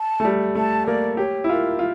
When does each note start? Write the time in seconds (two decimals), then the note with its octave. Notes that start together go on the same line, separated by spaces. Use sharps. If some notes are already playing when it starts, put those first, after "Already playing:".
Already playing: A5
0.20 A3
0.25 G3
0.55 A3 A5
0.87 A#3 D5
1.17 G4 C#5
1.44 E4
1.49 F4 A#4
1.79 F4